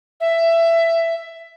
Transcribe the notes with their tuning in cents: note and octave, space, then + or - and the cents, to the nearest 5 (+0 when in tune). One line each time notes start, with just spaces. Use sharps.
E5 +15